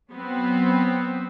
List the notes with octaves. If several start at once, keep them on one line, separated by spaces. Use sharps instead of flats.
F#3 B3 C4